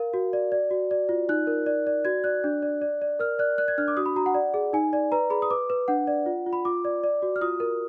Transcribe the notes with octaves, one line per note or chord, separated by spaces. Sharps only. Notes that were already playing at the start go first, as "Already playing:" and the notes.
Already playing: A#4 F5
F#4
D5
D5
F#4
D5
F4
D#4 F#6
A#4
D5
D5
F#4 G#6
D5 F#6
D4
D5
D5
D5
A#4 F6
D5 F#6
D5 F#6
G#6
D4 F6
D6
F#4 D#6
B5
F#4 A#5
F#5
D5
G#4
D#4 G#5
D5
B4 A#5
G#4 B5
D#6
B4 D6
B4
D4 F#5
D5
F4
F4
B5
F4 D6
D5
D5
F#4
F6
F4 D#6
A#4